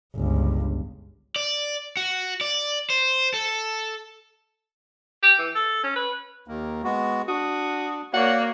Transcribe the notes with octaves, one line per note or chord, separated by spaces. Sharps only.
G1 C#2
D5
F#4
D5
C5
A4
G4
E3
A4
C#4
B4
D#2 A#3
G#3 B3 F#4
D4 F#4 D#6
A#3 F#4 C#5 D5 F#5